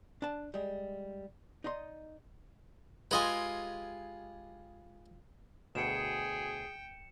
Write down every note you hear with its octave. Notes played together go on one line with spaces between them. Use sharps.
D4 A5
G3 G#3
D#4 D5 D#5 C6
G#3 F4 G4 B4 D#5 G#5
D2 B2 G#4 G5 C#7 E7